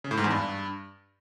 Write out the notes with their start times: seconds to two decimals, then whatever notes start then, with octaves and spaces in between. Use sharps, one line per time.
0.04 C#3
0.11 A2
0.17 G#2
0.24 E2
0.31 G2